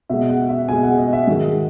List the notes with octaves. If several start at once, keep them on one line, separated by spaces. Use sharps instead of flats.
B2 G#3 E5
F#5
E5
B2 G#3 G#5
F#5
D#5
E5
G#2 D#3 G#3 F#4